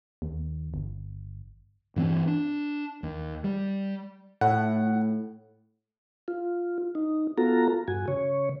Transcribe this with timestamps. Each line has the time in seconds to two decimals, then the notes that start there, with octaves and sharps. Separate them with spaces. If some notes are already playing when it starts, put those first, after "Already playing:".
0.22 D#2
0.74 G1
1.96 G2 E3 C4
2.28 D4
3.03 D#2
3.44 G3
4.41 A2 F#5
6.28 F4
6.95 D#4
7.38 B3 F4 F#4 A4 A#5
7.88 G2 F#4 G#5
8.08 C#3 C#5